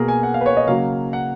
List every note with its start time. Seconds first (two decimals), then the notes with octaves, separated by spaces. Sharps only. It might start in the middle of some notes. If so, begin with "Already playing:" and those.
Already playing: B2 A#3 G#4 A#4
0.08 G#5
0.23 F#5
0.34 F5
0.41 B4
0.46 C#5
0.57 D#5
0.67 C#3 F#3 A#3 F5
1.13 F#5